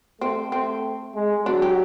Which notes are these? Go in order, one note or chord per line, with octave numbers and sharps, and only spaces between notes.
A3 C4
A3 C4
G#3
F#3 D4
G4